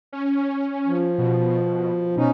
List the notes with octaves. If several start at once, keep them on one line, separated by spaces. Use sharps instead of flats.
C#4
F3
B2
B2 C#4 D#4